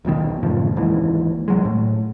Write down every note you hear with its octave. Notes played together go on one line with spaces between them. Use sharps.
D#1 B1 B2 D#3
F#2 A2 C#3 F3
G#1 D#2 G#2 E3
C2 F#3 G#3
A2